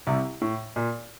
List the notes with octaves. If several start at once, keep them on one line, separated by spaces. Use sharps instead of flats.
C2 C3
A2
A#2